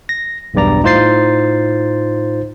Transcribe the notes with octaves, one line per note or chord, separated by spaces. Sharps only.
A#6
B1 E2 G2 D5 A#5
A2 D#4 F4 C5 A6 C7